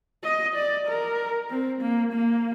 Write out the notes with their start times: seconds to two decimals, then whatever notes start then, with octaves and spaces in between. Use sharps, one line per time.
0.24 D#5
0.56 D5
0.87 A#4
1.50 C4
1.82 A#3
2.13 A#3